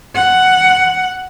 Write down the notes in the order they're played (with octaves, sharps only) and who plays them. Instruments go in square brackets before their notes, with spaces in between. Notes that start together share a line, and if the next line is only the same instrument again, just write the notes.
[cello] F#5